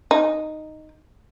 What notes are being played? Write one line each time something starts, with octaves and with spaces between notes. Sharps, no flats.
D#4